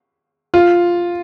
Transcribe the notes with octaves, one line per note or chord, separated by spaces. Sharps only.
F4